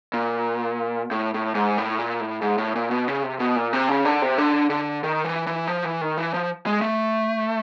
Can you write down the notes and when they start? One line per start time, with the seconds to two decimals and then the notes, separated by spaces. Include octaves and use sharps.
0.14 A#2
1.11 A2
1.34 A2
1.55 G#2
1.78 A2
1.99 A#2
2.21 A2
2.42 G#2
2.58 A2
2.75 A#2
2.91 B2
3.08 C#3
3.23 C3
3.40 B2
3.56 A#2
3.73 C3
3.89 C#3
4.05 D3
4.22 C3
4.38 D3
4.70 D3
5.04 D#3
5.25 E3
5.47 E3
5.68 F3
5.84 E3
6.01 D#3
6.18 E3
6.34 F3
6.66 G#3
6.82 A3